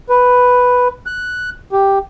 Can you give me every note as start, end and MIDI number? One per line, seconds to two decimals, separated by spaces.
0.10 0.88 71
1.06 1.50 90
1.73 1.99 67